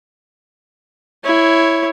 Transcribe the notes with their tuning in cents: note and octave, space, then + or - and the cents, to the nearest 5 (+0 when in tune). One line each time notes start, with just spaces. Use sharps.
E4 +0 C#5 +0